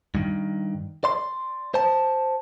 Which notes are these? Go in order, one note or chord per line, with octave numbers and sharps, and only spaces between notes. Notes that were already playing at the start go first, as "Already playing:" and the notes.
G2 D#3
D5 C6
C5 A5